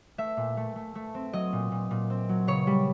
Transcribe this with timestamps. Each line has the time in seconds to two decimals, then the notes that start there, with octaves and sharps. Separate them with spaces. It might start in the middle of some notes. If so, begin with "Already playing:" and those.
0.18 A3 E5
0.37 A#2
0.57 A3
0.76 A3
0.95 A3
1.14 C4
1.33 F#3 D#5
1.53 A#2
1.72 A#2
1.91 A#2
2.10 C4
2.29 F#3
2.47 C#3 C#5
2.67 G3